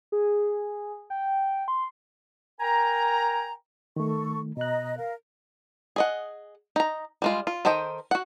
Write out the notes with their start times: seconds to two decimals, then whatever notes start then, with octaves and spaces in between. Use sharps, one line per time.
0.12 G#4
1.10 G5
1.68 C6
2.60 A#4 G5 G#5 A#5
3.96 D#3 A3 A4 C#6
4.57 B2 D#5 A#5 F#6
4.97 A#4 F5
5.96 G#4 D#5 F#5
6.76 D#4 A#5
7.22 G3 G#3 F4
7.47 F4
7.65 D#3 A4 C5 D#5 G5
8.11 F#4 F#5